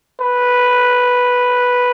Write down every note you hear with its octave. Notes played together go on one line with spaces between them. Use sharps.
B4